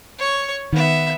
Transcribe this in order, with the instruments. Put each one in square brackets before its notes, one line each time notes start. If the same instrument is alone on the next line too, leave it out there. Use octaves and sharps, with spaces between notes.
[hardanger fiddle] C#5 C#6
[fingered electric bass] D#3 [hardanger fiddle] B3 E5